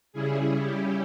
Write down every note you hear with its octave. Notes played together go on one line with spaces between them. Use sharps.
C#3 G3 C#4 E4 G#4
G4